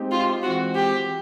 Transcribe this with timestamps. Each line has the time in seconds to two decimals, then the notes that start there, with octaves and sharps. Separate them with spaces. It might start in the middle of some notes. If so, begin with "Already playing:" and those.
Already playing: G#3 C4 D#4 G4
0.11 F4
0.43 E3 G#3 C4 F#4
0.75 G4